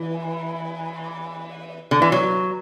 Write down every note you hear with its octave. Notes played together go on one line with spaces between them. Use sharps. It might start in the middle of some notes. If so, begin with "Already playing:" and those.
Already playing: E3
D3
E3
F#3